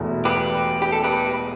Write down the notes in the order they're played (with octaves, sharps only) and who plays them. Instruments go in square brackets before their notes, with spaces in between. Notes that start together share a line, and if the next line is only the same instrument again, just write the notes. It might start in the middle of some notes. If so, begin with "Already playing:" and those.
Already playing: [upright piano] E1 E2 B2 A3
[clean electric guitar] G4 B4
G4
A4
G4 B4